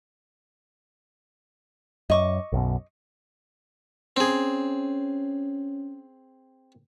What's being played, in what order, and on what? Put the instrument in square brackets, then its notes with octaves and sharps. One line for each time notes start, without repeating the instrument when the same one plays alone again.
[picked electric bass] F#2 [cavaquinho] D#5 C#6 D6
[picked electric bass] B1 F#2 B2
[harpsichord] C4 G#4 [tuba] C#4